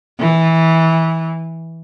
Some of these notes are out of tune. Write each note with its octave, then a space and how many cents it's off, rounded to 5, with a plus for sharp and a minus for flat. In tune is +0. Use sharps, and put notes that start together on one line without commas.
E3 -15